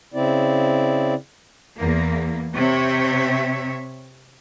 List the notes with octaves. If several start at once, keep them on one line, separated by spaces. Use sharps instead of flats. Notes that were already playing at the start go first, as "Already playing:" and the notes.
C#3 C4 E4 D5
E2 A#3
C3 C#5 E5